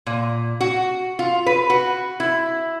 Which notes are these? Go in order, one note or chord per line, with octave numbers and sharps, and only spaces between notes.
A#2
F#4
F4
B4
F#4
E4